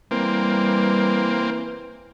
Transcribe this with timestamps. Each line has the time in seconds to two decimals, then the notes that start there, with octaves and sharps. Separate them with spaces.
0.11 E3 G3 A#3 C4